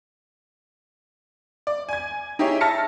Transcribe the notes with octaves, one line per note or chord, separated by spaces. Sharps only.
D5
G#5 G#6
D#4 E4 G4 G#4 C#5
E5 A5 F6 A#6 C#7